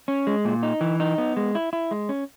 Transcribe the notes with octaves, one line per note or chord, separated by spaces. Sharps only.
C#4
G#3
A#2
D#4
E3
D#4
B3
G#3
E4
E4
G#3
C#4